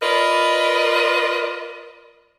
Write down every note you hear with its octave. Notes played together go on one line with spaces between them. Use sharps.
F4 A#4 B4 D5 D#5